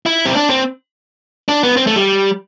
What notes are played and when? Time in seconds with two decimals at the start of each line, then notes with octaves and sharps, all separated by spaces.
0.06 E4
0.25 C4
0.35 D4
0.50 C4
1.48 D4
1.63 B3
1.77 C4
1.87 A3
1.96 G3